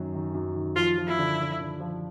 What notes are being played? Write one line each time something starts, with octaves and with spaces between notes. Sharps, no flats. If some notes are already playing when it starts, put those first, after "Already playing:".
Already playing: F#2 D#3 F#3
D#3
F#2
D#3
F3 F4
F3
E4
D3
D3
D3
F3